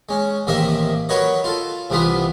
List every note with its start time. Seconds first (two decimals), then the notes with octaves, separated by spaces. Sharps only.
0.09 G#3 C#4
0.47 A1 C3 D#3 A#3 D#5 E5
1.09 F#3 F#4 A#4 B4 C#5 D#5
1.44 F4 A4
1.90 C2 C3 E3 B3 F4 D#6